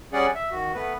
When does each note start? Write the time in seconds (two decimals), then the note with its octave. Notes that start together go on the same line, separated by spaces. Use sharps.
0.13 G3 C#4 G#4 D5 F#5
0.35 E5
0.51 D#3 F#4
0.74 A3 B3 B4